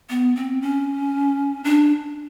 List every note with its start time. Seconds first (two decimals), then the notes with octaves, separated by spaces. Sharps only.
0.10 B3
0.36 C4
0.62 C#4
1.64 D4